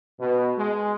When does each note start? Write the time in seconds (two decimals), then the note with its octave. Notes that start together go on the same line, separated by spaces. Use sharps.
0.20 B2
0.58 G#3